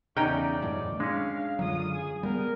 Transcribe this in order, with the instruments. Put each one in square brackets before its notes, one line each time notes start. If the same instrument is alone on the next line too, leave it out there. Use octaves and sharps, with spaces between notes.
[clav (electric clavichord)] E2 C#4 [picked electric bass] C#3 [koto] D#4 G5 [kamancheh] D5
[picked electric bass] F#2 A2
[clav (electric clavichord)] G#3 C#4 [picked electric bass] D4 [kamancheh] F5
[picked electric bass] F#2 D3 F#3 [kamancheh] F4 D#6
[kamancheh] G#4
[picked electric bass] G3 B3 [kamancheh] A#4